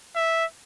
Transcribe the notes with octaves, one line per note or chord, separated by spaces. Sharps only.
E5